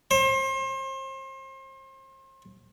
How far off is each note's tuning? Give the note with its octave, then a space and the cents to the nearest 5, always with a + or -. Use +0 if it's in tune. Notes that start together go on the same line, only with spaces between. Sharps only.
C5 +35